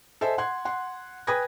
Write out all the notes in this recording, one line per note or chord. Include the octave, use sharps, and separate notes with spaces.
A4 C5 D#5 E5 G#5
F#5 C6 F#6 G#6
F#5 C6
B4 G5 G#5 D#6 G#6 A#6